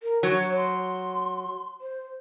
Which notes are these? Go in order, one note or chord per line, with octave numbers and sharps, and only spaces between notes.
A#4
F#3 C#5
C6
C5